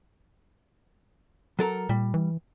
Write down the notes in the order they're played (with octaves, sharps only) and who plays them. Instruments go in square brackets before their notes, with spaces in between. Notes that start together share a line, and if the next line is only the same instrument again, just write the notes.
[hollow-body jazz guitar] F#3 A4 A#4
[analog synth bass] A#2 [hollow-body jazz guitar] G3
[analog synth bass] E3